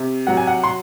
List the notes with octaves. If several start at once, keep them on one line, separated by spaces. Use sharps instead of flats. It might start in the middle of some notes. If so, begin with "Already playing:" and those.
Already playing: C3
F#3 F#5
G#5
F#5
C6